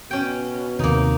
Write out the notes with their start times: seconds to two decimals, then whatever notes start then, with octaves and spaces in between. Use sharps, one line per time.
0.11 B2 C#4 G5
0.79 D#2 C3 D#3 A#3 D#4